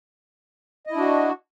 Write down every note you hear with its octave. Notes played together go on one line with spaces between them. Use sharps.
D4 E4 F#4 D#5